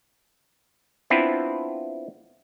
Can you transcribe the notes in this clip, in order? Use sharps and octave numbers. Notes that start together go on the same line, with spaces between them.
B3 C4 D4 E4 F4